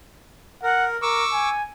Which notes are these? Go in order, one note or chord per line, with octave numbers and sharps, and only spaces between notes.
A#4 F#5
A#4 C#6 D6 E6
G#5